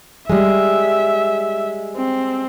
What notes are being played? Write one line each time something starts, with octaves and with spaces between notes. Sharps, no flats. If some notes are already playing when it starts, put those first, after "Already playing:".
G3 G#3 E5
C4